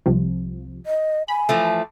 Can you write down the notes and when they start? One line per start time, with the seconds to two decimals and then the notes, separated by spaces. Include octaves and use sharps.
0.06 C2 C3 F3
0.86 D#5
1.28 G#5 B5
1.49 E3 F3 A3